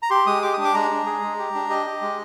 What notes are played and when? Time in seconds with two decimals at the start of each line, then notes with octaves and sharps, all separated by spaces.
0.03 A#5
0.10 G4 C6
0.26 G#3 D#6
0.42 G4 D6
0.53 D4 D#6
0.64 D6
0.74 G#3 A#5
0.91 D4
1.06 G#4
1.22 G#3
1.39 G4
1.55 D4
1.69 G4 D#5
1.86 G4
2.01 G#3